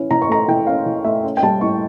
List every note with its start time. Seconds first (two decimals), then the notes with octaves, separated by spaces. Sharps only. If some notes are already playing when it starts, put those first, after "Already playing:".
Already playing: E3 C#4
0.11 E3 A#5
0.22 C#6
0.29 A3 A#5
0.48 E3 G5
0.67 C#4 F5
0.86 E3
1.04 A3 E5
1.24 C#4
1.37 G5
1.43 G3 A5
1.61 A2 C#6